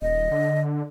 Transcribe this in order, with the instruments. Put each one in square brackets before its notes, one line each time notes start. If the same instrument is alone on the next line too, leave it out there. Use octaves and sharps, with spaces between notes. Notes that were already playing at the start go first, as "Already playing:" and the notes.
[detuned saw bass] D#1 [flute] D#5
[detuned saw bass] D3